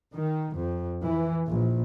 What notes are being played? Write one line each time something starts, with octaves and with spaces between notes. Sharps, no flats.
D#3
F2
E3
A#1